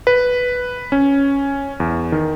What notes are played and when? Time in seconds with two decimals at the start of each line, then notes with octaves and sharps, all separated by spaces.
0.07 B4
0.92 C#4
1.80 E2
2.12 D#3